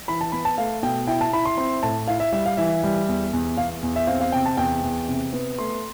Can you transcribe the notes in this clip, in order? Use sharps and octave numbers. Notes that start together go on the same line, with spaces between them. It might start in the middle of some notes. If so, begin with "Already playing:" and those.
E3 B5
A5
B3 B5
A5
A3 F5
B2 G5
E4 G5
A5
E4 B5
C6
C4 C6
A2 A5
E4 F5
E5
G3 E5
F5
E3 E5
G3
E2
E2
E2 F5
E2
E5
C4 F5
F5
C3 G5
A5
E2 G5
E2
C3
B3
A3 C6